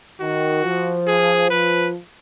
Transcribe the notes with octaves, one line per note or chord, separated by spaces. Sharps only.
D#3 F#4
F3
G#4
F3 B4